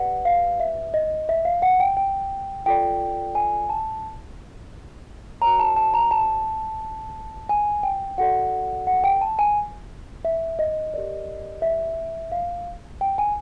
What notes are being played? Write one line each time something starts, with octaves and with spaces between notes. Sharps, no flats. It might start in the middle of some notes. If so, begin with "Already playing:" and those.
Already playing: G4 B4 D5 F#5
F5
E5
D#5
E5
F5
F#5
G5
G5
F4 A4 D5 G5
G#5
A5
F#4 A#4 C#5 A#5
A5
A5
A#5
A5
G#5
G5
F#4 A4 D5 F#5
F#5
G5
A5
G#5
E5
D#5
G4 A#4 D5
E5
F5
G5
G#5